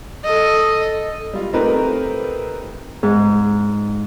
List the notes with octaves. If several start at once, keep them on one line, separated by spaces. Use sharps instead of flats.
A4 D#5
G3 F4
A3 C4 D#4 G4 A#4 B4
G#2